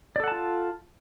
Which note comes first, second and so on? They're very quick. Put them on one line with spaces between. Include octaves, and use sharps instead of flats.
D5 A4 F#5 A5 F4